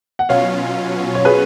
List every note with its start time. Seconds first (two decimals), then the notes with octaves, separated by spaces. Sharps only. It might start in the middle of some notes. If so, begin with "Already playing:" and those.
0.19 F#5
0.29 B2 F#3 C#4 F4 C#5 F5
1.15 C#5
1.25 G#4 B4